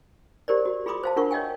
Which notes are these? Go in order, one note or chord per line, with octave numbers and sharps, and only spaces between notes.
G4 A#4 C5 D5
F#4
F4 G#4 B5 C6 D6 D#6
C5 F5 A5
D4 F4 A#4 F#5 C#6
C#5 D#5 F5 G5 G#5